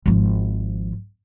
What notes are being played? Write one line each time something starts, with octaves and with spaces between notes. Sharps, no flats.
G#1 F3